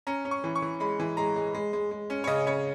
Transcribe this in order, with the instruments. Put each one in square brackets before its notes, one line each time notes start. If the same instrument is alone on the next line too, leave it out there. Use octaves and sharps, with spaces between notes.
[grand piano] C#4 A#5
C#4
C#6
E3
C#6
E3
G#3 B5
E3
G#3 A#5
G#3
G#3
G#3
G#3
C#4
C#5
C#3 D#5
C#3 C#5